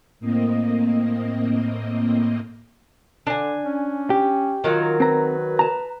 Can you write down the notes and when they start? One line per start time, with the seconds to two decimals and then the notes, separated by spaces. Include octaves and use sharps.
0.20 A2 A#3 C4 D#5
3.27 D3 D4 G#5
3.65 C#4
4.10 G4
4.64 D#3 F#3 F4
5.00 C4 B4 A#5
5.59 A5 A#5